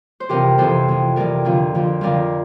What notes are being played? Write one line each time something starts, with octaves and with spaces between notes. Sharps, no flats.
C5
F2 C3 E3 G4 A#4
F2 C3 E3 A4 C5
F2 C3 E3
F2 C3 E3 A#4 D5
F2 D3 F3
F2 D3 F3
F2 D3 F3 A#4 D5